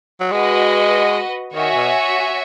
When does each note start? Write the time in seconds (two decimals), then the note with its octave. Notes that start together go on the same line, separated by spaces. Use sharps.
0.20 F#3
0.31 G#3 F#4 B4 D#5
1.54 D#3 F#4 C#5 E5 G#5
1.75 B2